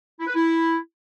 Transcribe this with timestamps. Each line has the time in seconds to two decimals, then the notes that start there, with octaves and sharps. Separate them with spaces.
0.20 E4
0.27 B4
0.35 E4